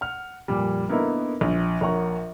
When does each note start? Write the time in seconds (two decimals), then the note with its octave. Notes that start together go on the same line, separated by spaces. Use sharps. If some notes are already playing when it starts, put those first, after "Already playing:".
0.01 F#5 F6
0.48 F2 A#2 G3
0.89 D3 A#3 B3 D#4 E4 A#4
1.41 A#1
1.81 A#1 A#4 C#5 F#5 C#6